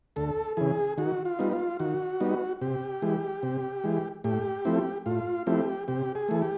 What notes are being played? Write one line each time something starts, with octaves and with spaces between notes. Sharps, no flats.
D2 A4
C#3 E3 G#4
D#3 F#4
F4
G3 B3 D#4
F4
D#3 F#4
G3 B3 D#4
C3 G4
E3 G#3
C3
E3 G#3
A2 G4
F3 A3 C4 E4
A2 F4
F3 A3 C4 E4 G4
C3 G4
G#4
E3 A3
G4